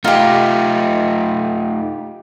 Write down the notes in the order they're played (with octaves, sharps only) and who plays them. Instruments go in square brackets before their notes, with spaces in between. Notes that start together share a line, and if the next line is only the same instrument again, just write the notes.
[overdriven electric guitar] A3 D#4 [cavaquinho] F4 G4